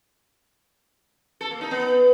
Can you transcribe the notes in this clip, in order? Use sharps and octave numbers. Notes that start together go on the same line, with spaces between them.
A4
A#3
D#4
B3